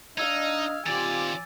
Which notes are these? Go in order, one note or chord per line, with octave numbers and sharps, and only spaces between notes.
D4 D#4 D#5 F5 E6 G#6
D#3 C4 F4 G4 D5 G#5 D6 A6